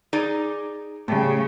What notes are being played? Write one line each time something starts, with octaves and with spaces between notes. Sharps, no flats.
D#4 G#4 D5
A2 C#3 G3